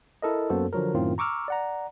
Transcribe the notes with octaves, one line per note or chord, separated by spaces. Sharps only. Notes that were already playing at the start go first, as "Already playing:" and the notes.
E4 A4 A#4 D#5
F#2 A#3 B3 F#4 A4 C5
D3 F3 F#3 A#4
F#2 A2 D#3 C4 F4
A#5 C#6 D6 E6 F6
D5 F#5 A#5